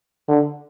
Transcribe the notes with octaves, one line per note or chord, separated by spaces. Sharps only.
D3